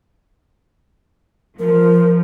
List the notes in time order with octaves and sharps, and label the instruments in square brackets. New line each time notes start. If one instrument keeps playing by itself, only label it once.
[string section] F3 [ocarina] A#4